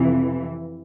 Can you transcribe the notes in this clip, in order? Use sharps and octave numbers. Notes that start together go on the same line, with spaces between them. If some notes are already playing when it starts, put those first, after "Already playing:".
Already playing: F2 C3 E3